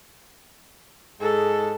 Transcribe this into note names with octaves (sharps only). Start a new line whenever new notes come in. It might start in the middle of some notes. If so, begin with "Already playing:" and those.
G#2 G#4 A4